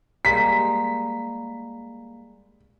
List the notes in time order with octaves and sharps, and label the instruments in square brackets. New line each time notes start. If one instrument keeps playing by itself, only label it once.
[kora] G3 G#3 A#3 [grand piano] B6